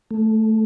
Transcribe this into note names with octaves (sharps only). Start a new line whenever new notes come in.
A3